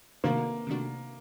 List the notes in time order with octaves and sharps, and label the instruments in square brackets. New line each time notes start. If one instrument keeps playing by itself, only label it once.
[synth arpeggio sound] C3 D#3 A3 D4 F#4 [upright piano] A#3
[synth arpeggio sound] C3 D#3 A3 D4 F#4